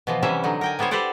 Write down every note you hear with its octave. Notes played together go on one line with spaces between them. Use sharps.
B2 E3 F3
C3 E3 G3 C#4 G4 E5
D3 F#3 D#4
A#4 G5 G#5
G3 B3 E4 C5 C#5
G4 A4 B4 C5 D5 F#5